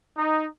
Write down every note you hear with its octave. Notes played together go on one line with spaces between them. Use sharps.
D#4